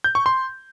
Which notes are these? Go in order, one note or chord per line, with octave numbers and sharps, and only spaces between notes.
G6
C#6
C6